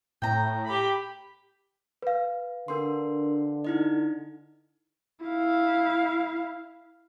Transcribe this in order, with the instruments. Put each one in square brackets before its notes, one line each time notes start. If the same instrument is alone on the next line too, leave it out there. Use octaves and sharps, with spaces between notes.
[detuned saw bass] A2 [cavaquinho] G5 A#5
[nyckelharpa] G4 B5
[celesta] B4 F5
[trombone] D3 [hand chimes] D4 A#4 C6
[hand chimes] D#4 E4 D#5
[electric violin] E4 F5